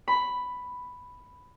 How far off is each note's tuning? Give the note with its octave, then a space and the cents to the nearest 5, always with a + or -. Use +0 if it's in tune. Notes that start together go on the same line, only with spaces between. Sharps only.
B5 +5